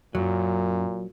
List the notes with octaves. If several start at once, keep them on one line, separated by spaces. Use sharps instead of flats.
F#2 A#2 F#3